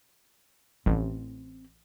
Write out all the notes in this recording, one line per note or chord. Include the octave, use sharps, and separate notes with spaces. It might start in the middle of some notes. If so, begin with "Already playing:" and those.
A1 C4